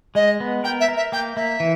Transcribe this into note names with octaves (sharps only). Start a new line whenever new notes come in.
G#3 D#5
B3
A#4 G5
E5
A#4
E5
A#3 G5
A#3 E5
E3